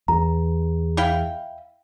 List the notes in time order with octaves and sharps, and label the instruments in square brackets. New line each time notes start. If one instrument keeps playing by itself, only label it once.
[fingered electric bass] E2 [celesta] A#5
[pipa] E4 F5 G5